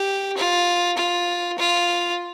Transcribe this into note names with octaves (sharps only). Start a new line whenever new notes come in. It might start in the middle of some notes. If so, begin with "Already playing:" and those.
Already playing: G4
F4
F4
F4